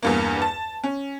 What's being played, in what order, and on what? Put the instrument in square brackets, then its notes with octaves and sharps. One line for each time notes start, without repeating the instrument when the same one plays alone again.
[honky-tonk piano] E2 G2 A#3
A5
C#4